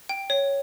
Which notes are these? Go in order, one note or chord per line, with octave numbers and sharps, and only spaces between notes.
G5
C#5